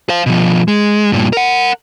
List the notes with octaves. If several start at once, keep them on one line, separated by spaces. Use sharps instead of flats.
C5 F5
B2 F3
G#3
G2 A#2
A#4 F#5